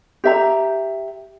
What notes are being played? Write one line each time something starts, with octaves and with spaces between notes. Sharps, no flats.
G4 E5 A#5